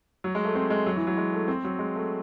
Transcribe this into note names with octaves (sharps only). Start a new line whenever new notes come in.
F#3
G#3
A3
C4
G#3
F#3
E3
F#3
G#3
A3
C4
F#3
G#3
A3